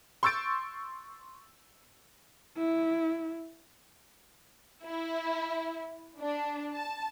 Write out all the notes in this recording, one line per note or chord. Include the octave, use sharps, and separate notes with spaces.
C6 C#6 E6 G6 A6 D7
E4
E4
D4
A5